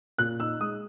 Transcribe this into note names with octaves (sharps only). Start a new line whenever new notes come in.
A#2 F#6
D#4 E6
G#3 D#6